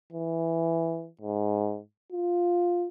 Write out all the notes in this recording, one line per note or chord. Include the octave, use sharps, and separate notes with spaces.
E3
G#2
F4